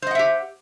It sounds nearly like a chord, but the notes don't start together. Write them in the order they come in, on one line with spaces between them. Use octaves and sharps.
C5 D#5 F#5 E5 G4